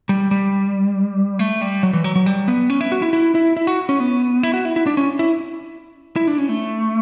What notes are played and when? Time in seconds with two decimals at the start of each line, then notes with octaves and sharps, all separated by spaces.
0.09 G3
0.31 G3
1.39 A3
1.61 G3
1.83 F#3
1.93 E3
2.04 F#3
2.16 F#3
2.26 G3
2.48 B3
2.70 C#4
2.81 E4
2.92 F#4
3.02 E4
3.13 E4
3.35 E4
3.57 E4
3.67 F#4
3.89 C#4
4.00 B3
4.43 E4
4.54 F#4
4.65 E4
4.76 E4
4.87 D4
4.97 C#4
5.19 E4
6.16 E4
6.27 D4
6.38 C#4
6.49 A3